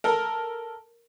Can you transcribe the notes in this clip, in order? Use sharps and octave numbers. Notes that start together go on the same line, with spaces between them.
A4 A#4